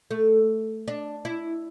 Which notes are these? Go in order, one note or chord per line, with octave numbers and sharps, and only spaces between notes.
A3
D4
E4